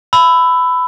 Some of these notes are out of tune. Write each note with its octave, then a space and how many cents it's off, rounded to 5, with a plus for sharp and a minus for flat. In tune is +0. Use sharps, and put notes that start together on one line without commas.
B5 +20 E6 +0